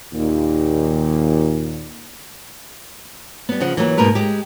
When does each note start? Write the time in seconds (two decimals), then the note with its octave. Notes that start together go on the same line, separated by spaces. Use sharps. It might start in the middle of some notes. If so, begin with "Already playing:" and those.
0.13 D#2 A#2
3.49 G3 B3
3.60 C#3 F3 F#5
3.77 E3 F#3 A#3
3.97 G#2 B2 A#3 A#4 B4
4.15 G#3 G4